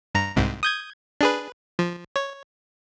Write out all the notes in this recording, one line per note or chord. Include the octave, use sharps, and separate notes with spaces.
G2 A#5
C2 G#2 C3
D#6 G6 G#6
D4 G#4 B4
F3
C#5